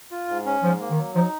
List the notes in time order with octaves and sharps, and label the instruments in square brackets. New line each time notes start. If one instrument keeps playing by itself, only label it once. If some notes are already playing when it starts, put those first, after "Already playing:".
[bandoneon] F4
G#2
C#4
[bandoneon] G#2 [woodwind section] F3
[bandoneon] A#3
[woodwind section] D#3
[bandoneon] F#3
[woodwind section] F3 [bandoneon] D#4